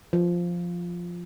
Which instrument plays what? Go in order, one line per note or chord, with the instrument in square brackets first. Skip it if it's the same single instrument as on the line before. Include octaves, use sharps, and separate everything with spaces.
[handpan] F3